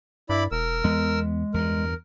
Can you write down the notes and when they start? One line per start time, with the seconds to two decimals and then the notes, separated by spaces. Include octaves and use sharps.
0.30 G2 E4 D5 B5
0.52 E1 A#4 E6
0.84 E2 G#3 B3
1.54 E2 G2 A#4